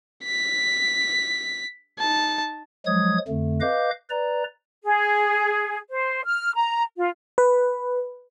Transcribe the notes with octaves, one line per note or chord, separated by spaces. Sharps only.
B6
D#4 A5
F3 F#3 G#3 D#6 G#6
F2 D3 A3
B4 D#5 F5 D6 G6
B4 D5 A#5
G#4
C5
F6
A#5
F4
B4